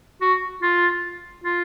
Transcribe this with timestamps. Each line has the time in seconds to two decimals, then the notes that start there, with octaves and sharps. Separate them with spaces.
0.22 F#4
0.63 F4
1.44 F4